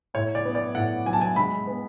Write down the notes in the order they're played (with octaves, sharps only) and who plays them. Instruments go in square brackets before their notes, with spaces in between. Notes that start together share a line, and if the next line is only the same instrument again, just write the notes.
[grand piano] A2 C#5
D5
B3
D5
A2 F#5
F#3 G#5
A5
G#5
G#3 B5
B3